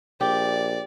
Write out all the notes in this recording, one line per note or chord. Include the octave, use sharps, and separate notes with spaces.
A#1 G4 D5